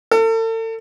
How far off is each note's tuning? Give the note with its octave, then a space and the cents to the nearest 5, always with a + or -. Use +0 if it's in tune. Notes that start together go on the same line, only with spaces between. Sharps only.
A4 +40